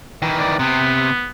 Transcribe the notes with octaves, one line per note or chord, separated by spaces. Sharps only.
D#3 E3
D5
C3 B3